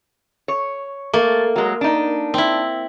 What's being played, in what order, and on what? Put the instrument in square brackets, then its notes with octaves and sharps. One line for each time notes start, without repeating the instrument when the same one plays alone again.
[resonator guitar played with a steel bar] C#5
[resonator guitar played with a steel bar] A3 [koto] A#3
[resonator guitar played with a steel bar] F#3 G#3
D4 D#4
[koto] C4 E4